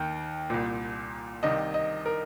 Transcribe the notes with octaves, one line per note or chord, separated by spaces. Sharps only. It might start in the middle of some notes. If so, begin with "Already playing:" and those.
Already playing: D#2 D#3 G5
C2 A#2
C2 C3 D#3 D#5
D#5
A#4